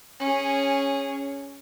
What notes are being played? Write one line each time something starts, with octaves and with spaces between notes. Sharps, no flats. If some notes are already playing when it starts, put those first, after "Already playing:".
C#4 G#4